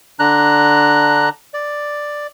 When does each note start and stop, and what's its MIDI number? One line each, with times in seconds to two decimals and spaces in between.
0.19 1.29 50
0.19 1.29 62
0.19 1.29 82
0.19 1.29 90
1.54 2.27 74